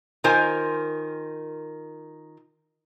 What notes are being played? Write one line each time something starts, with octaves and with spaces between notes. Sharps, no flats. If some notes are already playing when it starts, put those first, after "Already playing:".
D#3 F4 A#4 C5 G#5